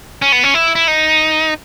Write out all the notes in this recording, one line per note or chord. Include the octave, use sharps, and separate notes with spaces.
C#4
B3
C#4
E4
E4
D#4